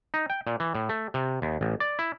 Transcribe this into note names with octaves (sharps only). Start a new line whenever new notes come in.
D#4
G5
A#2
E3
A2
A3
C3
D#2
A1
D5
E4